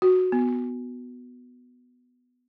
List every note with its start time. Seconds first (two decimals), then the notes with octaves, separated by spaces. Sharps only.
0.02 F#4
0.32 B3